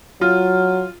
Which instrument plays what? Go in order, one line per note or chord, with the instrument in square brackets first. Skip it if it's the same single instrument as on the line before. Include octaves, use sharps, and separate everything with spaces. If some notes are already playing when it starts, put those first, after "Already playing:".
[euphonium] F#3 [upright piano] F4